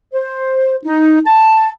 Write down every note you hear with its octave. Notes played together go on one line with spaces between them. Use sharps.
C5
D#4
A5